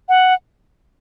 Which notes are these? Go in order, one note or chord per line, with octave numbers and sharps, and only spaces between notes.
F#5